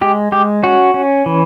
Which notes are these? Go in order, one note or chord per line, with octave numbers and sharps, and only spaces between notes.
G#3 G4
G#3 G4
C#4 F#4
C#4
E3